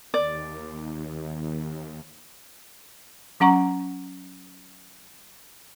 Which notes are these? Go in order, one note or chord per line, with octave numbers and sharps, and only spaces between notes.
D#2 D5
F#3 C#4 F#5 A#5 C#6